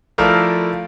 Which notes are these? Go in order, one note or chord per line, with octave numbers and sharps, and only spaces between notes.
F3 A3 E4 F4 A#4 D5